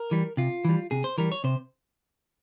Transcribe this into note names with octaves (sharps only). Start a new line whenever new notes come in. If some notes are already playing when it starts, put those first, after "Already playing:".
Already playing: A#4
E3 G3
C3 F4
E3 G3
C3 G#4
C5
E3 G3 A#4
C#5
C3 C5